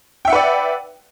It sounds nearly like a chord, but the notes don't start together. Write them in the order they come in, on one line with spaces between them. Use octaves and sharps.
G5 E5 F#5 B4 D5